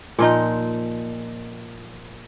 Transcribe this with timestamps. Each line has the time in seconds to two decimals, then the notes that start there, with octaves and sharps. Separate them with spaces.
0.19 A#2 F3 D#4